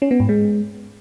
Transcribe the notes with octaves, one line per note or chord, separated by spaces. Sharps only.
C#4
B3
G#2
G#3